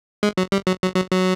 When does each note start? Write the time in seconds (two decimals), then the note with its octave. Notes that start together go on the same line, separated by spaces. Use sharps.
0.23 G#3
0.37 F#3
0.52 G3
0.67 F#3
0.82 F#3
0.96 F#3
1.11 F#3